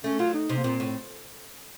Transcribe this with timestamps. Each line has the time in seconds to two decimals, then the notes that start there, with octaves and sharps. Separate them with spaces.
0.04 A3 C#4
0.19 F#3 F4
0.34 D#4
0.49 C3
0.57 A#3
0.64 A#2 C4
0.80 A2